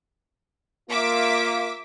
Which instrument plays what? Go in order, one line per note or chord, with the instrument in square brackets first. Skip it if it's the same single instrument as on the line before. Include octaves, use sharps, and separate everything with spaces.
[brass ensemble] A#3 F4 [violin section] E5 D6 B6